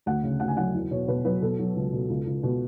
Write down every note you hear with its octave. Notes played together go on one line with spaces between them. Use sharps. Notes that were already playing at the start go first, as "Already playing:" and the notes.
D2 F#5
C#3
D2 F#5
G#5
F#3 F#5
E2
B2 C#5
B2 B4
F#3 B4
B2 A4
F#3
C#2
B2
C#2
C#2
B2